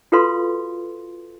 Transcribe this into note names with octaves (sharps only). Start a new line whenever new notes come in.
F4 F#4 A4 B4 F5 C6